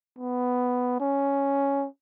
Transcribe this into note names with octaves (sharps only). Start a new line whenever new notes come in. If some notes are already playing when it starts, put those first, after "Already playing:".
B3
C#4